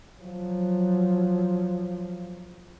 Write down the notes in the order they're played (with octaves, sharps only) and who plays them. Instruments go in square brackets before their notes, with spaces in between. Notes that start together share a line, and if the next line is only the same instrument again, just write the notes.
[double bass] F3 F#3